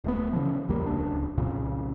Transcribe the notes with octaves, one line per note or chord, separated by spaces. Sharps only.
D1 A3 B3
C#3 E3 F3
A#1 E2 G3 A#3
D1 C#2 D4
C2 F2 A#2 C#3